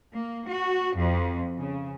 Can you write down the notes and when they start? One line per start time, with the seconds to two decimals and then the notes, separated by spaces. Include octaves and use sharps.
0.12 A#3
0.48 F#4
0.96 F2
1.58 C#3